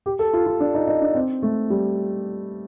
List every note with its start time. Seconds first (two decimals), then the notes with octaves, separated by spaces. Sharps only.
0.06 G4
0.19 A4
0.33 F4
0.46 F4
0.60 D4
0.74 D#4
0.87 D#4
1.02 D4
1.15 C4
1.42 A3
1.70 G3